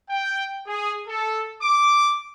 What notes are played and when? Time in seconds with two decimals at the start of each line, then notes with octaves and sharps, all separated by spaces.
0.10 G5
0.67 G#4
1.08 A4
1.63 D6